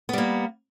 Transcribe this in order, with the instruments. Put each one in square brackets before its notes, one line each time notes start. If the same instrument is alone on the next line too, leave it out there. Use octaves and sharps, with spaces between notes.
[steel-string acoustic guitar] B3
G3
A#3